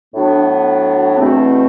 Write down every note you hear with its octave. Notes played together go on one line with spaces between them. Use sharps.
A2 F#3 B3 D4
E2 B2 A3 C4